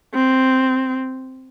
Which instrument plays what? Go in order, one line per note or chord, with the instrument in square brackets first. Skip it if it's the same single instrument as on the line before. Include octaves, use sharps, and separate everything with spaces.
[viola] C4